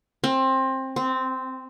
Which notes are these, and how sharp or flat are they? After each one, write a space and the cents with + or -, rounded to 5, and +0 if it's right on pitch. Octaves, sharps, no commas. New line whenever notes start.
C4 +20
C4 -10